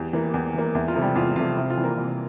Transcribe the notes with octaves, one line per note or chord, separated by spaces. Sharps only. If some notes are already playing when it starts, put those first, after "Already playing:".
Already playing: E2 G4
E3 A#3
E2
E3 A#3
E2 E4
F4
C3 F3 A3
G3 G4
E2 F4
C3 F3 A3 F4
C3 E4
F4
E3 G3
A#3 A#4
C3